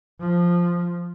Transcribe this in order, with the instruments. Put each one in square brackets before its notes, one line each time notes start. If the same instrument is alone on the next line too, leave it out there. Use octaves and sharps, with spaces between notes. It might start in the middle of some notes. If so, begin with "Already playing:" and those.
[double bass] F3